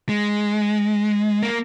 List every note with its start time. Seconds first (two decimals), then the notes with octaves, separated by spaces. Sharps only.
0.09 G#3
1.43 A#3